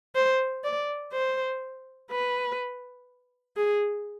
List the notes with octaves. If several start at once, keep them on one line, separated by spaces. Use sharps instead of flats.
C5
D5
C5
B4
G#4